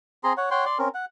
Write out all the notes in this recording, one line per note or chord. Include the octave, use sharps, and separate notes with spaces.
C4 G#4 A#5 C6
C#5 F#5
C#5 F#5 G5 C6
D5 C6
C4 C#4 A#4
F#5